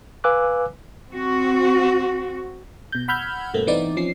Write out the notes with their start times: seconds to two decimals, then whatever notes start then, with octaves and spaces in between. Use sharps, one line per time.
0.24 B4 F5 G#5 D6 E6 F#6
1.11 C4 F#4
2.92 B2 G6
3.08 F#5 B5 E6 F6 G6 G#6
3.54 G2 B2 A3 A#3 C4
3.67 E3 B3 C4 D#4 E4 D5
3.97 F3 C4 C#4 C7